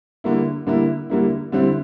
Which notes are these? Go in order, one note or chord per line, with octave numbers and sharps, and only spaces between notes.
D3 G3 A#3 E4
D3 G3 A#3 E4
D3 G3 A#3 E4
D3 G3 C4 E4